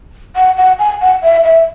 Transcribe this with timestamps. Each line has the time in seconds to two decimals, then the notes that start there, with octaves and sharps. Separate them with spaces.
0.36 F#5
0.57 F#5
0.79 G#5
1.01 F#5
1.22 E5
1.44 E5